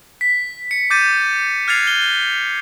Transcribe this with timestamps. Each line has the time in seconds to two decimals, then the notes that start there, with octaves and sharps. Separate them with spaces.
0.21 B6
0.71 C#7
0.90 D6 G6 A6 D#7
1.68 F6 F#6 G#6 A6 C7 F7
1.87 G7